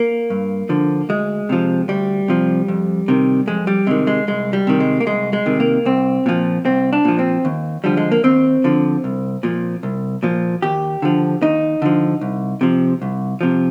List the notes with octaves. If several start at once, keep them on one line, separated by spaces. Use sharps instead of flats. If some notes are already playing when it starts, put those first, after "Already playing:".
Already playing: A#3
G2
D3 F3
D2 G#3
C3 F3
D2 G3
C3 F3
F2
C3 D#3
F2 G#3
G3
C3 D#3 G#3
G#3
C2 G#3
G3
C3 D#3
G#3
A#3
C2 G#3
G#3
C3 D#3
A#3
C2 C4
A#2 F3
C2 C4
D4
A#2 F3
C4
D#2
D3 F3 G3
G#3
A#3
D#2 C4
D3 F3
C2
A#2 F3
C2
A#2 F3
D#2 G4
D3 F3
D#2 D#4
D3 F3
C2
C3 F3
C2
C3 F3